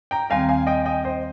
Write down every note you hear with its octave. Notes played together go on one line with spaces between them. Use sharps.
G5 A#5
D#2 D#3 G3 C4 F5 G#5
F5 G#5
D#5 G5
D#5 G5
C5 D#5